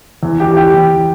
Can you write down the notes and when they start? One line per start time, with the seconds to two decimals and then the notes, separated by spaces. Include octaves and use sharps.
0.23 E2
0.40 G4
0.48 E2
0.57 G4
0.74 E2